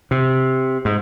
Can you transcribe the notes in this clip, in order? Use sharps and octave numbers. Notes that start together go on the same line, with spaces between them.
C3
G#2